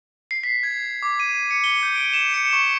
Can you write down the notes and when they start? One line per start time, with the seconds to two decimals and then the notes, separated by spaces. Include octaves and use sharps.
0.31 C7
0.43 B6
0.63 G#6
1.03 D6
1.20 D#7
1.51 C#7
1.64 G7
1.83 G6
1.95 D7
2.13 E7
2.34 C#7
2.53 C#6